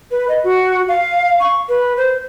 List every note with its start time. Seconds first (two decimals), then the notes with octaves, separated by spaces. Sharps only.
0.11 B4
0.29 D#5
0.44 F#4
0.88 F5
1.40 C#6
1.69 B4
1.97 C5